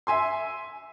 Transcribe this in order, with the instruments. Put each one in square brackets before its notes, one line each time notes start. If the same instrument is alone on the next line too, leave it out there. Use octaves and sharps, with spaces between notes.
[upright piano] E5 G#5 C6